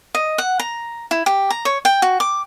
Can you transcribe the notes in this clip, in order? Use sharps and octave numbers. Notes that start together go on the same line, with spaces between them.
D#5
F#5
A#5
E4
G4
A#5
C#5
G5
F#4
D6